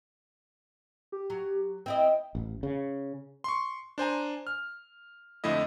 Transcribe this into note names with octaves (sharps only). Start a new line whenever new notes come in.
G4
F#3
C4 E4 D#5 G5
A1
C#3
C6 C#6
D4 C5 G#5 A#5
F6
F2 D3 A3 E4 D#5